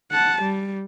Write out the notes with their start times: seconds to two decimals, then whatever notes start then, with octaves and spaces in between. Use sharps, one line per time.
0.12 F#5 A5
0.43 G3